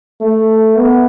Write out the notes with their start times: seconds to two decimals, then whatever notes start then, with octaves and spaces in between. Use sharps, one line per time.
0.21 A3
0.76 B3